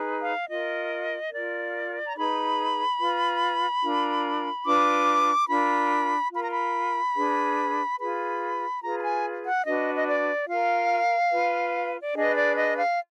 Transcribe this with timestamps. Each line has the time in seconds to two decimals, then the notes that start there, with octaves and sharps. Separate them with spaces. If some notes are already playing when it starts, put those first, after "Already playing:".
Already playing: D#4 G#4 B4
0.22 F5
0.49 F4 A#4 D#5
1.32 F4 A#4 D5
2.06 A#5
2.16 D#4 G#4 B4 B5
2.99 F4 B4
3.82 D4 F4 A#4
4.65 D4 F4 B4 D6
5.49 D4 F4 A#4 B5
6.32 F4 A#4 B5
6.41 A#5
6.50 B5
7.15 D4 G#4 B4
7.98 F4 G#4 B4 B5
8.81 F4 G#4 B4 A#5
8.98 A#5
9.02 G#5
9.44 F#5
9.65 D4 F#4 B4 D#5
9.94 D#5
10.07 D5
10.48 F4 A#4 F5
11.31 F4 B4
12.01 D5
12.15 D4 G#4 B4 D#5
12.35 D5
12.55 D#5
12.77 F5